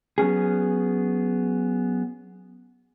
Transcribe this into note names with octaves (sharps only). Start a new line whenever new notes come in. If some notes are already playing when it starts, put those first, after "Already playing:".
F#3 B3 C#4 G#4